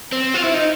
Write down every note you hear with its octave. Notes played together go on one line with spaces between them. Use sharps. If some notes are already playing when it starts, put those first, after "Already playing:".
C4
F4
E4
D#4